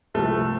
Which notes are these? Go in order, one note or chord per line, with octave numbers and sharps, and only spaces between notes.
C2 C3 F3 A3